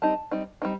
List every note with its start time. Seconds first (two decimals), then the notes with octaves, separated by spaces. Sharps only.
0.02 G3 C4 D#4 A5
0.31 G3 C4 D#4
0.62 G3 C4 D#4